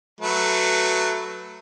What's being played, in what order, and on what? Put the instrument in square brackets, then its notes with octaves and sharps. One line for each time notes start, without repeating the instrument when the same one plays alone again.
[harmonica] F#3 A3 B4